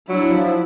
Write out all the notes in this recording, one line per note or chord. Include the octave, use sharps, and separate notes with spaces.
F#3 D4 E4
F3